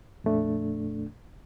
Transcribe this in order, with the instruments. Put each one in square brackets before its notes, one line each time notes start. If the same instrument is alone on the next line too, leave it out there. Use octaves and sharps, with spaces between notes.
[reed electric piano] F2 A#2 A3 D4